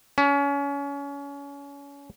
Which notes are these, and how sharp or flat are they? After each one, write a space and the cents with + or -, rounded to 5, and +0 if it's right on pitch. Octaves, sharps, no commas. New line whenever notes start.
C#4 +30